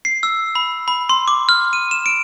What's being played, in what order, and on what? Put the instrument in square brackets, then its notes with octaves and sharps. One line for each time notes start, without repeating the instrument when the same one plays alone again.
[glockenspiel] C7
E6
B5
B5
C6
D6
F6
D#7
E7
D7